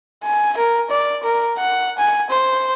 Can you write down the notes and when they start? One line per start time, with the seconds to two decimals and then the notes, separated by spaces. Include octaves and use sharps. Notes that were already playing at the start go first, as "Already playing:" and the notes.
0.24 G#5
0.57 A#4
0.90 D5
1.23 A#4
1.58 F#5
1.98 G#5
2.30 C5